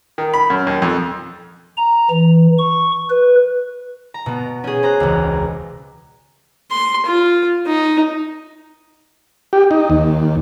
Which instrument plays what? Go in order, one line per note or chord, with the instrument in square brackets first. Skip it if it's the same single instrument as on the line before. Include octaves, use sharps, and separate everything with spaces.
[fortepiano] D#3
B5
F#2
D#2
F2
[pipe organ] A#5
E3
C#6
B4
[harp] A#5
B2 B3
C#4 G#4
C5 A#5 F#6
E1 C#2
[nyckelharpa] C6
F4
D#4
[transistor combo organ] G4
D#4
D#2